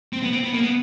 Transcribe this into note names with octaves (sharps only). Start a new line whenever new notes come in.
C4
B3
C4
B3
A#3
B3